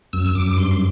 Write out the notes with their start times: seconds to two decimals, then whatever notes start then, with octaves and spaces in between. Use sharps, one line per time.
0.13 F#2 E6
0.35 F#2 D6
0.57 G2 C6
0.71 C6